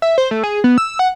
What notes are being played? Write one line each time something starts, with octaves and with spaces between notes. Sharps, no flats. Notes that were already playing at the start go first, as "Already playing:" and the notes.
E5
C5
A3
G#4
B3
E6
F#5